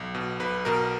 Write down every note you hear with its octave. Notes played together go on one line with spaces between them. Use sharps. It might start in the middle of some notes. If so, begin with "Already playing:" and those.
Already playing: B1
B2
B1 B4
B2 A#4